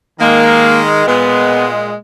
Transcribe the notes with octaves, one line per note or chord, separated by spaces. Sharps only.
D#3 G#3 A#3
A#2 G#3 B3